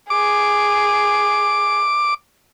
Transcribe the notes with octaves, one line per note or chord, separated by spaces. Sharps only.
G#4 D6